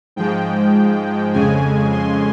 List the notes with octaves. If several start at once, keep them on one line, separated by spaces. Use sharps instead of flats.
G#2 F3 G#3 G5
F2 C#3 G#3 G#5
C6